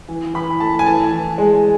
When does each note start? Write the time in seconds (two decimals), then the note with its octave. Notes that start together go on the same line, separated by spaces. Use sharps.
0.09 E3
0.34 E3 B5
0.60 A3 A5
0.79 G#5
0.86 E3 A5
1.13 E3
1.38 G#3